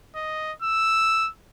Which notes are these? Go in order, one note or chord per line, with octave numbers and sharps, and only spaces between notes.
D#5
E6